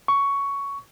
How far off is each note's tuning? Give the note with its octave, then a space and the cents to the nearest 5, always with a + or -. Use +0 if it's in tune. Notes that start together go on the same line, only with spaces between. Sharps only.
C#6 +10